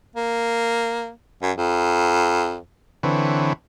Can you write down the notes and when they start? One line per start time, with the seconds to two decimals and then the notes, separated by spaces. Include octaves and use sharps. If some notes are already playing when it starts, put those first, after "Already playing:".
0.16 A#3
1.42 F#2
1.57 F2
3.03 D3 E3 C4 B4 C#5